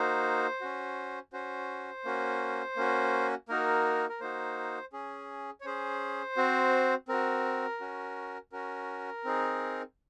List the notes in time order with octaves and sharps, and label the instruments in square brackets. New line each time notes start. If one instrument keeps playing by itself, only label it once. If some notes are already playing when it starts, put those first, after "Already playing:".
Already playing: [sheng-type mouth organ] A#3 D#4 F#4 C5
C#4 F#4
C#4 F#4 C5
A#3 C#4 F#4
A#3 C#4 F#4
A#3 D#4 F#4 A#4
A#4
A#3 D#4 F#4 C5
C#4 G#4
C#5
C#4 G#4 C5
C4 F#4
C4 F#4 A#4
C#4 F#4
C#4 F#4 A#4
C4 D#4 G#4